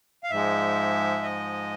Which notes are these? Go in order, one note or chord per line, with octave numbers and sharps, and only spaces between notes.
F5
G#2 F3 G#3 E5
D#5